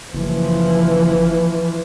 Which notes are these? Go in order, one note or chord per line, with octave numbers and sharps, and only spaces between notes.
F#1 E3 F3